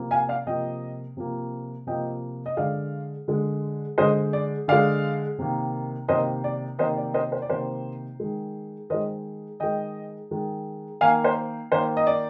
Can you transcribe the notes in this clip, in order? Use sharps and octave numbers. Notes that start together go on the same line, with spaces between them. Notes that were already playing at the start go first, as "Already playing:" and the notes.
Already playing: C3 F3 A#3
F5 G#5
D5 F5
C3 F3 A#3 D#5 G5
C3 F3 A#3
C3 F3 A#3 D#5 G5
D#5
D3 G#3 D5 F5
D3 G#3
D3 G#3 C5 D#5
D5
D3 G#3 D5 F5
C3 D#3 A#3
C3 D#3 A#3 C5 D#5
D5
C3 D#3 A#3 C5 D#5
D5
C5 D#5
C5
D5
C3 D#3 A#3 C5
D#3 G#3
D#3 G#3 C5 D#5
D#3 G#3 D#5 G5
D#3 G#3
D#3 A#3 F5 G#5
C5
D#3 A#3 C5
D#5
D5